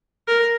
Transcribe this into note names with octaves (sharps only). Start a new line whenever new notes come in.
A#4